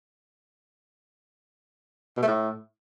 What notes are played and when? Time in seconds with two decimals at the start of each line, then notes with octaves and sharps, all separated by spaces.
2.17 B2
2.22 A3
2.27 A2